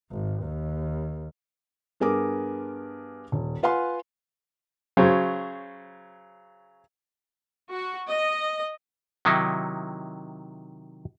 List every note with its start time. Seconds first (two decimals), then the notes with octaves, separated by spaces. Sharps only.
0.12 G#1
0.44 D#2
2.00 G2 B3 G#4 A#4 D6
3.32 D#1
3.63 F4 B4 F5 F#5 G#5 C6
4.97 C#3 F#3 C5
7.71 F#4
8.09 D#5
9.25 C3 D#3 F#3 D#4 E4